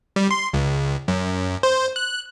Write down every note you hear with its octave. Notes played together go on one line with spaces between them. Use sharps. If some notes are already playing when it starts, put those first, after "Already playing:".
G3
C6
C#2
F#2
C5
F#6